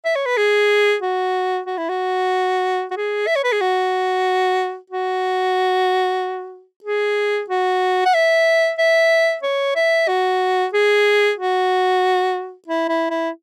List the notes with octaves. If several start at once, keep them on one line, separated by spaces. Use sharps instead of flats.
E5
C#5
B4
G#4
F#4
F#4
E4
F#4
F#4
G#4
E5
C#5
B4
G#4
F#4
F#4
G#4
F#4
F#5
E5
E5
C#5
E5
F#4
G#4
F#4
E4
E4
E4